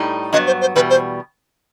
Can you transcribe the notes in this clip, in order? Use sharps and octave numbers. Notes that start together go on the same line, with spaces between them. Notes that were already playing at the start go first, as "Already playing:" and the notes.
Already playing: A2 G3 D#4
G2 F#3 B3 D#5
C5
C5
E2 B2 G3 B4
C5